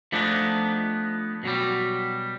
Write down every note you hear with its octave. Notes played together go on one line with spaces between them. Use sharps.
F3 A3 B3 D4 D#4
B2 F#3 G3